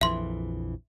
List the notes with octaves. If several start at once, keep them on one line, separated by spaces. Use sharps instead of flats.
A#1 F2 E3 E5 C6